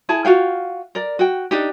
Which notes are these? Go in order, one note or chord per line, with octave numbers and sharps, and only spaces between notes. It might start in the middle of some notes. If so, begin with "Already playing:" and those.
E4 G#4 A5
F4 F#4 F5 G5
A#4 D5
F#4 G5
D4 D#4 G4